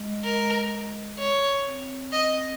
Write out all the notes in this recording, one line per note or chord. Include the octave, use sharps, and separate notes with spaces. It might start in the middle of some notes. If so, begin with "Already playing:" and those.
Already playing: G#3
A#4
C#5
C4
D#5